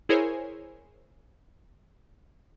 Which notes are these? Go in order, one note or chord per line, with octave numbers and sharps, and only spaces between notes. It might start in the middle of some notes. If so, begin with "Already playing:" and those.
E4 G#4 A#4 C5 C#5 G#5